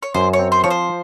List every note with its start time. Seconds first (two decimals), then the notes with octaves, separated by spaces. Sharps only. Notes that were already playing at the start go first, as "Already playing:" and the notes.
0.03 C#5
0.14 F#2 C5
0.33 C#5
0.39 C4
0.52 C5
0.64 F3 C#5
0.70 C5